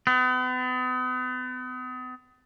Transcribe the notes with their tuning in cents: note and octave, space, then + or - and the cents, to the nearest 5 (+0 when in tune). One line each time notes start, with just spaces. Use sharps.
B3 +40